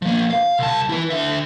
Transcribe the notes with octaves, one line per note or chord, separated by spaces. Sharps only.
F3 A#3
F5
C2 A5
E4 B4
D3 E5